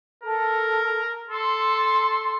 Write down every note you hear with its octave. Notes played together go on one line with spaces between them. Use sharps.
A4 A#4
A4 C6